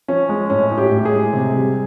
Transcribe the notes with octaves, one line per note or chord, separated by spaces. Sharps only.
F3 C#4
G#3
A2 C#4
A2
G4
A2
G#4
G#3
C3
G3